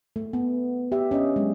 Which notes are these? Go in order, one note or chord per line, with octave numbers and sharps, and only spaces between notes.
A3
B3
G4 E5
C#4 D4 D#5
F#3 G#3